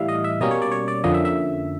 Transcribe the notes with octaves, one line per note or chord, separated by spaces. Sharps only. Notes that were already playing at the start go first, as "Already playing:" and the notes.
Already playing: A2 E3 G3 E5 F5
D#5
E5
B2 G3 A#3 C#4 D#5
C#5
D5
C#5
D5
F2 D3 F3 A#3 C#4 D#5
E5
E5